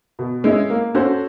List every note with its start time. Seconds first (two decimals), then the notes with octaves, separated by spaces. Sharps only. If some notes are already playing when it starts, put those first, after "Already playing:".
0.19 B2
0.44 G#3 C#4 E4
0.70 A#3
0.95 C#4 F#4 A4 C5